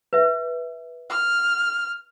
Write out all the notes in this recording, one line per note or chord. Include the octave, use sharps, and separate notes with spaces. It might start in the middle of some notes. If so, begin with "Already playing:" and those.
B4 E5
F6